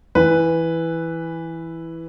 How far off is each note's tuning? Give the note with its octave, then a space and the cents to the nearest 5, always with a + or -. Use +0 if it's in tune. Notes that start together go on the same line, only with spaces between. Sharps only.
E3 +0 B4 +0